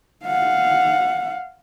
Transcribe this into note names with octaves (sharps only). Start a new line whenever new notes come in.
F5 F#5